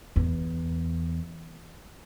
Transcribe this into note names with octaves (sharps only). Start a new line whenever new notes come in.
E2